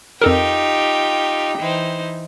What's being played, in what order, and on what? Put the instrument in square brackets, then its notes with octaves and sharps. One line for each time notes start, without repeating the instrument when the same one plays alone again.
[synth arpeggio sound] F2 A4 A#4 [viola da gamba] D#4 F4 G4 [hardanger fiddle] G5
[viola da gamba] E3 D#4 C5